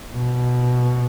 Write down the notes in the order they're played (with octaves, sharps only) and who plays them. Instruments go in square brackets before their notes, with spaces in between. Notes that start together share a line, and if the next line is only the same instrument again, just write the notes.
[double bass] B2